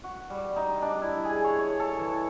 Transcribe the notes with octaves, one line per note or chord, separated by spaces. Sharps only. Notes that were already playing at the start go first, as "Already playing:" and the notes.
F#4
G3
D#4
D4
E4
G#4
C#5
C#5
A4
E3